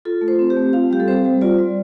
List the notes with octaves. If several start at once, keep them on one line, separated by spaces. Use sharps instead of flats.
F4 A4
A3
C5
C4
G4
A3
F4 F5
G3 G4
A4
C4 C5
G3
F4 D5
G3